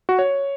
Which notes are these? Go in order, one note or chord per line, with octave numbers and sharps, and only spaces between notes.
F#4
C#5